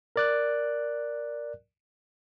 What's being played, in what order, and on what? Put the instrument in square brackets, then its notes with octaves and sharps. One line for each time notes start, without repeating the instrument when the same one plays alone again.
[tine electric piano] A#4 D5 F#6